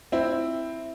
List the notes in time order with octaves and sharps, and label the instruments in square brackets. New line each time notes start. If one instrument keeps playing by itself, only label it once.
[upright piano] C4 E4